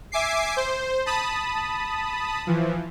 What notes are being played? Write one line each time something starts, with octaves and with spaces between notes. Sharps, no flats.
E5 G#5 D6 C7
C5
A5 B5 D#6
E3 F3